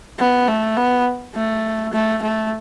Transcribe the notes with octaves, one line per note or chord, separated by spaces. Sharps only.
B3
A3
B3
A3
A3
A3